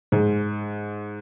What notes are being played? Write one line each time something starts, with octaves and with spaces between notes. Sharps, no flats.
G#2